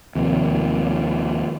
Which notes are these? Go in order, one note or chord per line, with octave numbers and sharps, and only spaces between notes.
D#2 C3 F3